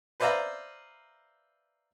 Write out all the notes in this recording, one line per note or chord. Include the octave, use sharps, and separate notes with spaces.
B4 C5 D5 E5 F5 A#5